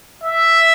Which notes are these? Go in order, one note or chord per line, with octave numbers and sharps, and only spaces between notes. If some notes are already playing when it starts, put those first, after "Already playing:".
E5